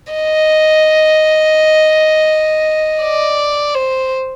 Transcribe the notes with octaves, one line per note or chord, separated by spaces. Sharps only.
D#5
D5
C5